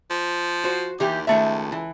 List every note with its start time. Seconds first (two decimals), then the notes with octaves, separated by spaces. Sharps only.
0.10 F3
0.64 F#4 C5
1.00 D#2 E3 G4
1.27 C#2 D#3 A3 E5
1.72 E3